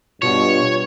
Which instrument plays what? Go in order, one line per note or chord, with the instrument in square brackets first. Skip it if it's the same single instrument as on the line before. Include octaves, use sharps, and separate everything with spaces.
[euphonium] G2 [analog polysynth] B2 [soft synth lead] F4 [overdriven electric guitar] C#5